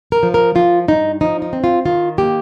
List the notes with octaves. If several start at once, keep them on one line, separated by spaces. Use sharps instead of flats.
A#4
F3
A#4
F3 F4
G2 D#4
F3 D#4
D#4
C4
F4
D#3 F4
A#3 G4